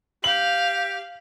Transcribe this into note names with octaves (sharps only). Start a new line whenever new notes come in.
G4 F5 F#7